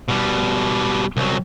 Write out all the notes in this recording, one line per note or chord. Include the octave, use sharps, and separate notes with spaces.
B2 G3
C2 F#3